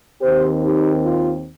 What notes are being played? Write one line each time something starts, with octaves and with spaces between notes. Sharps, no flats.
D#2 D#3 C4 G4 C5
D#4 G4
F4